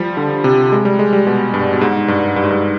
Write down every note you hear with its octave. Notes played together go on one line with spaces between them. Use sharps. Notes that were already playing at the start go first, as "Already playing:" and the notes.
Already playing: F3 G3
D3
C3
G#3
G3
G#3
G3
B2
G2
B2
G#2
G2
G2
G#2
G2